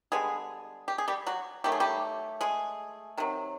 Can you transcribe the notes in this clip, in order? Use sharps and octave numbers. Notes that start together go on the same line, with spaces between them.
D3 G3 G#3 B3 G#4
G4
G#4
G3 G4
F#3 F#4
D#3 F#3 A3 G4
G#4
G3 G4
G#3 G#4
C3 D#3 F#3